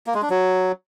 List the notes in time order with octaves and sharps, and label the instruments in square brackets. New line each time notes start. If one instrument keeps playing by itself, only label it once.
[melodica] A#3
G#3
D4
F#3